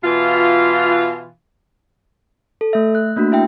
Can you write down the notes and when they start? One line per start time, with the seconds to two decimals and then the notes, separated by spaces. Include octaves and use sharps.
0.03 B2 E3 F4
2.61 A4
2.73 A3 E5
2.95 F#6
3.16 A3 A#3 D4 F#4
3.32 E4 E5 G5